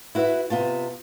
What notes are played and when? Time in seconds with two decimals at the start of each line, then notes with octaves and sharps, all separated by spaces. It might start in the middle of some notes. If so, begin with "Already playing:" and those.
0.15 E4 F#4 B4 C#5 E5
0.50 C3 B3 F4 A5